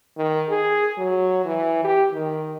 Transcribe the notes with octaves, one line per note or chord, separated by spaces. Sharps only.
D#3
G#4
F#3
E3
G4
D#3